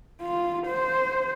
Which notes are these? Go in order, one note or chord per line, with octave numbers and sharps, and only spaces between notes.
F4
C5